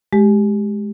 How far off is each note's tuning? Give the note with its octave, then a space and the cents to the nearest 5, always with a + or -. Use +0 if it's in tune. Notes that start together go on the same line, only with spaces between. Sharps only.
G#3 +15 G4 +0